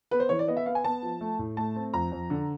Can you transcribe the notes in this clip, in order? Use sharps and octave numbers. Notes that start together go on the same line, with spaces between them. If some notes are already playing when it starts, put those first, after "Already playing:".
B3 B4
C5
E3 C#5
D5
B3 D#5
E5
B3 F5
G#5
B3 A5
F3
A3
A2
A3 A5
C4
F2 A#5
F2
D3